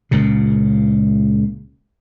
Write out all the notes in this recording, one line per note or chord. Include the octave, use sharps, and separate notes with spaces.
C#2 A#2 C#3